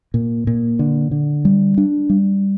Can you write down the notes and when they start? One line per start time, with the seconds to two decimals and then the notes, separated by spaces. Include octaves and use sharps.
0.14 A#2
0.47 A#2
0.79 D3
1.11 D3
1.45 G3
1.78 D4
2.10 G3